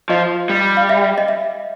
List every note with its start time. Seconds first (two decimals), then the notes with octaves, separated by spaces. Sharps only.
0.10 F3 D#5
0.49 G3
0.77 F5
0.89 E5
1.18 D#5
1.28 E5